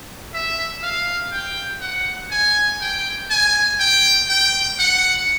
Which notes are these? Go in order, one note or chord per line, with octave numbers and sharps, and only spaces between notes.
E5
F5
G5
F#5
G#5
G5
G#5
G5
G5
F#5